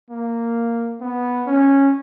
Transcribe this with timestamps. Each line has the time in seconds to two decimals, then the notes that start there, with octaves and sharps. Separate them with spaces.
0.10 A#3
1.01 B3
1.47 C#4